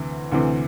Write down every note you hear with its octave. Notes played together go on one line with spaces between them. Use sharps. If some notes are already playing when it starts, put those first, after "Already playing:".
Already playing: D2 C3 E3
D2 C3 E3